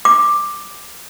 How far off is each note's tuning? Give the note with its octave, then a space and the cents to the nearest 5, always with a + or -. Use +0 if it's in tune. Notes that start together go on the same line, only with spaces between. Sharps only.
D6 +10